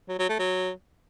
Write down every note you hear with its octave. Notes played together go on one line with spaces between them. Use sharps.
F#3
F#3
A3
F#3